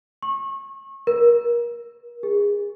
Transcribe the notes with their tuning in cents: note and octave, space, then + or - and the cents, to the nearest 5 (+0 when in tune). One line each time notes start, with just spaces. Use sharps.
C#6 -30
A#4 +30
G#4 -25